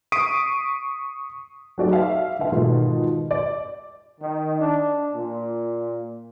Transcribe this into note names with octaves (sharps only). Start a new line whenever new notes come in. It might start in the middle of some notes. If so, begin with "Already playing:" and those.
C#6 D#6 B6 C7 D7 D#7
F#3 A3 D#4 F#4 G#4 D5
E5 F5
D3 E5 F5
G#2 B2 D#3 A3 F4 G#4
D5
D#3
D4
A#2